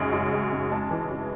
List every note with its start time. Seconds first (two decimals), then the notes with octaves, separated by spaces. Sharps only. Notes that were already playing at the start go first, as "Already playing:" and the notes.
Already playing: F#2 C#3 G#3
0.13 F#2
0.33 G#3
0.52 C#3
0.71 G#3 A5
0.91 E3
1.11 F#2